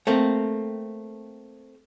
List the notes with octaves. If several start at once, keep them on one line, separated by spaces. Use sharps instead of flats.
A3 A#3 C4